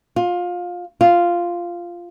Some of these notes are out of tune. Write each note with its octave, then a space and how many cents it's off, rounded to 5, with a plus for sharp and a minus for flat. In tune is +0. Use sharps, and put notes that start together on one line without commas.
F4 +20
F4 -5